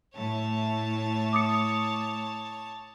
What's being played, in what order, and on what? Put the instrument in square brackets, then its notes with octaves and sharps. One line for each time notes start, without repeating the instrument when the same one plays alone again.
[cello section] A2 [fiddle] C#5 A5
[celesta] D6 D#6 C#7